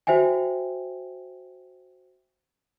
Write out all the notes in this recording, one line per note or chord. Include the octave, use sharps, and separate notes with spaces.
F#4 C5 E5 G5 G#5